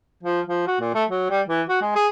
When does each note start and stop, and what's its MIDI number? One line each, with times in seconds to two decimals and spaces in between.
0.23 0.41 53
0.46 0.65 53
0.67 0.77 66
0.80 0.93 46
0.94 1.04 57
1.10 1.25 54
1.30 1.41 55
1.48 1.62 52
1.69 1.78 66
1.81 1.92 56
1.95 2.07 68